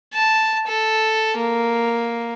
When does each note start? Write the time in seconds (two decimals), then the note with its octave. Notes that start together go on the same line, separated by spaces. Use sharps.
0.14 A5
0.67 A4
1.37 A#3